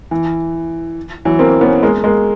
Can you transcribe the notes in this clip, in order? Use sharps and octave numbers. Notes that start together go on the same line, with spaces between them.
E3
E3 F#3
A#3 C4
B3 C#4
G#3 A#3
G#3 A#3